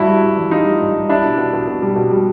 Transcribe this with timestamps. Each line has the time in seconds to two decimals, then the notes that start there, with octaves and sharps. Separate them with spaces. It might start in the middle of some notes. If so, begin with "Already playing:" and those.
Already playing: G2 E4 F#4
0.08 G3
0.23 G2
0.37 E3
0.51 G3 D#4 F4
0.65 G3
0.80 G2
0.94 G2
1.09 G3 D4 E4
1.24 B2
1.38 B2
1.53 B2
1.68 B2
1.82 G3
1.96 B2
2.11 G3